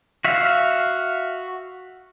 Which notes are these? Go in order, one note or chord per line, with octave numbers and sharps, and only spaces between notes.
F#4 E5 F5